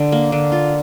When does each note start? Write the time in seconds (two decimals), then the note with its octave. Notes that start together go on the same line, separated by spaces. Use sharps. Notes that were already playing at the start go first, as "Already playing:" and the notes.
Already playing: D3
0.12 A#3
0.32 D3
0.52 F4